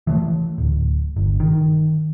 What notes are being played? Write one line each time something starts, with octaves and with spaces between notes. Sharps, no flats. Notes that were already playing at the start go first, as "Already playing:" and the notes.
E3 A3
D1
G1
D#3